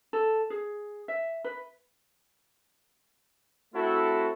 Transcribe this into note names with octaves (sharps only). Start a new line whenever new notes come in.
A4
G#4
E5
B4
A3 C4 E4 F#4 A4